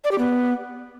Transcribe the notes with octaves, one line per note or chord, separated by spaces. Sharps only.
D5
G4
B3